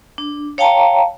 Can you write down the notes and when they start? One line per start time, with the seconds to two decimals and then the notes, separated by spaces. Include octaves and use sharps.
0.18 D4
0.58 C#5 F5 G5 A5 A#5